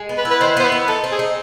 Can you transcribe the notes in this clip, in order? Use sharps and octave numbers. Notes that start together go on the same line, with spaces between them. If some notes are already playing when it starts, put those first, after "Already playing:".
Already playing: G#3
B3
B4
E4
B4
D#3 C5
B3 C5
B4
E4
D#4 A4
C4
G#4
D#4